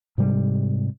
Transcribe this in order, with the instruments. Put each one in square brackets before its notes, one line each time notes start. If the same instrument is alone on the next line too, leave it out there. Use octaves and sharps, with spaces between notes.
[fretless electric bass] G#2 C3 G3 G#3